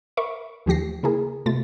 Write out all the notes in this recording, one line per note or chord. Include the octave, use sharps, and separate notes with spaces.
A#4 E5 B5 C#6 D6
D#2 F3 A3 G4 A#6 C7
C#3 A#3 E4 G#4 A#4
C3 A3 F4 A6